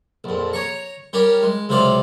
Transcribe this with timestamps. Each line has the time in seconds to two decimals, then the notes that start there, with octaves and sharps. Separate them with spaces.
0.24 A#1 F2
0.53 C#5 A#5 C#6
1.13 G3 C#4 G4 A#4
1.43 G#3
1.69 C#2 C3 F#3 C5 D5 F5